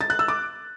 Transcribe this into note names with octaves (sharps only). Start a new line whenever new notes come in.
A6
F#6
E6
D6